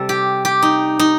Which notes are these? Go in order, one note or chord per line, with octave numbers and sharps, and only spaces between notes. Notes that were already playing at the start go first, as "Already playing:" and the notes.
Already playing: C3 G3 A4
G4
G4
D#4
D#4